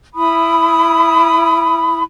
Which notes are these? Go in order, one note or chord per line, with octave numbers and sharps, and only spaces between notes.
E4 B5 D#6